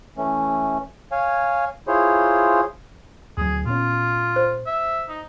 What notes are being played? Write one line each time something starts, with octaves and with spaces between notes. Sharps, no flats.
E3 A3 C#4
C#5 F5 G#5
E4 F4 G#4 C5 C#5
D2 F#3 G#4
A#2 B3 C#4 F4
C5
E5
D#4